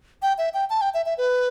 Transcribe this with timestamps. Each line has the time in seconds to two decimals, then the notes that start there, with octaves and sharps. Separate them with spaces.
0.22 G5
0.38 E5
0.54 G5
0.70 A5
0.81 G5
0.94 E5
1.06 E5
1.18 B4